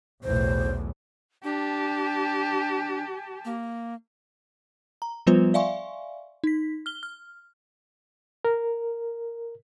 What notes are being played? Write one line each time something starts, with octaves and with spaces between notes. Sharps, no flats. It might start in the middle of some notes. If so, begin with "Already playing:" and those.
B1 E2 A2 C5
D4 G4 A5
A#3
A#5
F3 G3 B3 F4 B4 C5
D5 E5 F5 G#5 C6 C#6
D#4 B6
F6 G7
F6
A#4